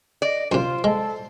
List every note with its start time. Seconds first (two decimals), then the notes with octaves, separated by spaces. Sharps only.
0.22 D5 D#5
0.52 F#2 C3 F4 C5
0.84 G#3 A4